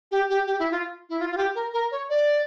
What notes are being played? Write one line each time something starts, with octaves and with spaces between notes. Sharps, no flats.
G4
G4
G4
E4
F4
E4
F4
F4
G4
A#4
A#4
C#5
D5